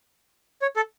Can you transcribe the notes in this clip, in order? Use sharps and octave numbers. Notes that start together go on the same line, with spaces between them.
C#5
A4